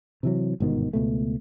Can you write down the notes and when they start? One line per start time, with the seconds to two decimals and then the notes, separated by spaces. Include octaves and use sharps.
0.23 C3 E3 F#3
0.60 G1 G#2 B2 D#3
0.93 C#2 B2 A3